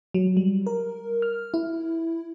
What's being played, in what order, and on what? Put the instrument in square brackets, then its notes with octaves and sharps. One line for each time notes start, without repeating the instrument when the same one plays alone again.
[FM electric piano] F#3
G3
A#4
F6
E4